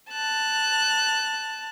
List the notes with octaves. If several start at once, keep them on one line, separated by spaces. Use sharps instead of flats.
A5 F#6